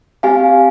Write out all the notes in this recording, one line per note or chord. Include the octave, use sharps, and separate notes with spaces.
C4 G4 F5 G#5